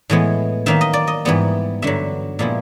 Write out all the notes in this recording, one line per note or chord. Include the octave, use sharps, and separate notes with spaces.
A2 E3 G#3 B3
D#3 F#3 A#3 D#4 E5
D#5
D5
D#5
G#2 E3 G3 B3
G2 D3 F#3 E5
A#2 F3 G#3 B3 E4